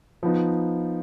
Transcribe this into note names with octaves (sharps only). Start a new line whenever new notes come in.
F3 B3 D#4